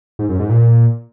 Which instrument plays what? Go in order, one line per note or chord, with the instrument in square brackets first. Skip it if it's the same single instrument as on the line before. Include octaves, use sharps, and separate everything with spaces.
[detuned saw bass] G#2
F#2
G#2
A#2
A#2